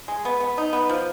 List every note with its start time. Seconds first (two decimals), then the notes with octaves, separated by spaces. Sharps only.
0.08 G#3
0.25 B3
0.40 B3
0.58 D#4
0.73 B3
0.89 F3